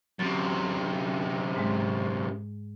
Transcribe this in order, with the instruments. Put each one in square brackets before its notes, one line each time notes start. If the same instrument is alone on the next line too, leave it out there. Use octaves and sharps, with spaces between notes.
[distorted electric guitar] F#2 C3 [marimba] A6
[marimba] G#2 G#3